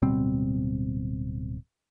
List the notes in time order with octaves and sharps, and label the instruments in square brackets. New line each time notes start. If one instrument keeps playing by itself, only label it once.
[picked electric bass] D1 B2 G3 C4